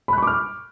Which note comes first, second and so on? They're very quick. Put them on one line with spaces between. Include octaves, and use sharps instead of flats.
B5 F#6 C#6 D6 F6